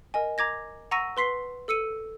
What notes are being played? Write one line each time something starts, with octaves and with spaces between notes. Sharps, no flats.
A#4 D#5 G#5
A#5 D6 G#6 A#6
F#5 A#5 C#6 E6 A#6 D#7
B4 C6 B6 C7 G7
A4 E6 C#7 D#7